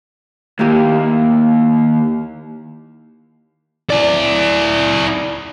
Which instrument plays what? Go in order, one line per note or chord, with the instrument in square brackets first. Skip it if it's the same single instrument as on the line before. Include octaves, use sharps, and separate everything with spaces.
[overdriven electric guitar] D#2 [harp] A#3 E4 G4
[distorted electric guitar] E4 D5